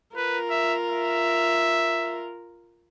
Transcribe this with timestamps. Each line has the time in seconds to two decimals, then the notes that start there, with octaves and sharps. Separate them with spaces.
0.16 F4 A#4 B4
0.50 E5
0.90 E5